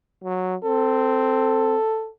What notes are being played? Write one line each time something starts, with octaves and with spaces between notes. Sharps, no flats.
F#3
C4 A4